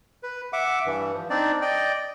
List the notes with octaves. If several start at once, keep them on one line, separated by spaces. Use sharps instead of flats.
B4
E5 F#5 D6
G2 E3
F3
C4 D4 D#4 D5
D5 D#5 G5